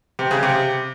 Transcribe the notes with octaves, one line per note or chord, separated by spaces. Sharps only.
C3
C#3
C3